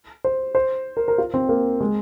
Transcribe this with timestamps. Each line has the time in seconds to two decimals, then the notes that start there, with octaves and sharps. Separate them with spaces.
0.24 C5
0.55 C5
0.97 A#4
1.08 A#4
1.18 F4
1.34 C4
1.49 A#3
1.80 G#3